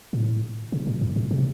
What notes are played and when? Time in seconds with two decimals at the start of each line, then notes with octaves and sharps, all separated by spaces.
0.13 A2
0.72 C3
0.87 A2
1.01 F#2
1.16 G#2
1.31 C3